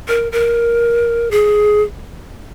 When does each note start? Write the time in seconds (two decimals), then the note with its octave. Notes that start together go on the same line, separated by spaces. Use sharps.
0.08 A#4
0.32 A#4
1.31 G#4